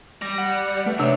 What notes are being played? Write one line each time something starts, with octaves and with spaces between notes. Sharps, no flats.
G3 A#6
F#5
A3 B4
C3 D#3 D4 G4 C#5 E5